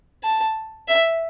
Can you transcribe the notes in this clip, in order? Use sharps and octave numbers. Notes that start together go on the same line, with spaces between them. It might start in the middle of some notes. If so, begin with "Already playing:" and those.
A5
E5